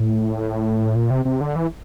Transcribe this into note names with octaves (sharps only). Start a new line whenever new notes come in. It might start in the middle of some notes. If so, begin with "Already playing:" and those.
Already playing: A2
A#2
C3
C3
D3
E3